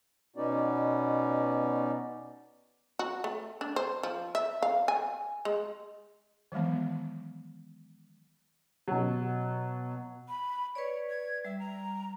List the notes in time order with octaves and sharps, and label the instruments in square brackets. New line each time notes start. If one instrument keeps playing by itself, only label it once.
[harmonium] B2 B3 C#4 D#4 F#4 D5
[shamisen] F#4
A3
D4
C5
F3
E5
F5
G#5
G#3
[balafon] D#3 E3 F#3 G#3 B3
[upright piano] B2 F#3
[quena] B5
[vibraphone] B4 D5 [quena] C#5
[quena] G#6
[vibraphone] G3 [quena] E5
[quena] A#5